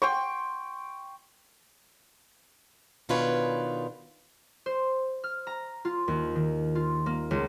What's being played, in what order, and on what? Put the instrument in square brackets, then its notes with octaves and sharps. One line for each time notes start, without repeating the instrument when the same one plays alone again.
[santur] G5 C6 C#6
[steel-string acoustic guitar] B2 D#3 D4 F4 B4 C#5
[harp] C5
F6
A#5
F4
D#2
D#3
F4
A#3
C#2